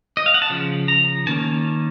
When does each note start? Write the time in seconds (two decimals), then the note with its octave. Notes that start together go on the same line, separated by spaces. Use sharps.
0.17 D#5
0.26 F5
0.34 F#5
0.42 A5
0.50 C#3 F3
0.88 A#5
1.27 D#3 A#3 C#4 A5